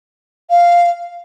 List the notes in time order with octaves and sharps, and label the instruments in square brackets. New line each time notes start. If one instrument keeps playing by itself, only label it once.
[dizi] F5